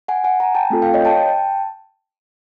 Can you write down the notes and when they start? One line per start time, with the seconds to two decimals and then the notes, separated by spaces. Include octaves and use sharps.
0.08 F#5 G#5
0.24 F#5 G#5
0.40 G#5 A#5
0.55 G5 A5
0.70 A3 C4 F4 A4
0.82 F5 G5
0.94 C#5 D#5
1.05 G5 A5